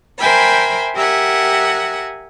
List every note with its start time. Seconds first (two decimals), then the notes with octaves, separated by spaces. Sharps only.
0.19 A#4 C5 E5 G5 G#5 B5
0.94 G4 A#4 E5 F#5 G#5